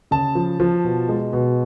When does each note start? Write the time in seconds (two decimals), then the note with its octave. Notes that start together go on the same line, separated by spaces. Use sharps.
0.11 C#3 A5
0.35 F3
0.60 F3
0.84 B2
1.09 G#3
1.33 B2